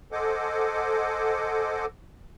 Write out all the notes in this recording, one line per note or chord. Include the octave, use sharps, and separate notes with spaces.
A4 C5 D#5 F#5 G#5 D6